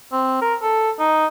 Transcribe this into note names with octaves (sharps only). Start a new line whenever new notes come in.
C4
A#4
A4
D#4